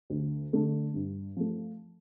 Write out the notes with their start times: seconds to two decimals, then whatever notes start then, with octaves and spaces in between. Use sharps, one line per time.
0.10 D2
0.53 D3 A3
0.94 G2
1.37 F3 A3